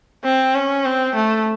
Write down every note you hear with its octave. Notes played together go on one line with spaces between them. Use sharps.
C4
C#4
C4
A3